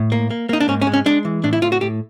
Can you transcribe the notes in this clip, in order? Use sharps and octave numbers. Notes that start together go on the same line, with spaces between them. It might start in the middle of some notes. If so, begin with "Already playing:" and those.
Already playing: A2
A#3
A#3
A#3 D#4
D4
G#2 C#4
C#4
G#3
C#4
G#3 D4
E3
A2 D4
E4
A2 F4
F#4
A2 G4